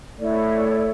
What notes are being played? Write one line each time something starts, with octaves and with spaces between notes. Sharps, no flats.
A3 E4 C#5 D5